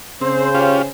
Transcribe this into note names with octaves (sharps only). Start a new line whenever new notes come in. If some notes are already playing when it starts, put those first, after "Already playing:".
C#3 C4 C5
C#4 F4 G4